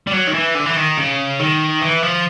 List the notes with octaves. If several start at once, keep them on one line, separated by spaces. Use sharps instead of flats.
G3
F#3
D#3
E3
D3
E3
D#3
C#3
D#3
E3
F3